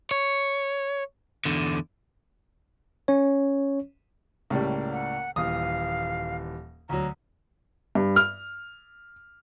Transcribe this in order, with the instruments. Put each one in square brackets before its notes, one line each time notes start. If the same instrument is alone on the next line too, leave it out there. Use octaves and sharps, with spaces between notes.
[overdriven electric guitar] C#5
E2 D3
[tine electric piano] C#4 C#5
[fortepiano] C#2 A2 G3 [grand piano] A#3
[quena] F#5
[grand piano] D#1 E3 [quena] F5 [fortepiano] D#6
[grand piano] D2 F#3 [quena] A#5
[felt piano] G2
F6